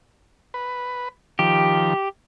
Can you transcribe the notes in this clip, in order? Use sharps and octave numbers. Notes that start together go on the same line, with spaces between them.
B4
D#3 F3 G4